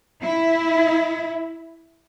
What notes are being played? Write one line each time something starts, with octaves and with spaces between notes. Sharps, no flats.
E4